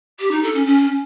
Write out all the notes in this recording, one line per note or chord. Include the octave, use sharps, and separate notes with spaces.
G4
D#4
A4
C#4
C#4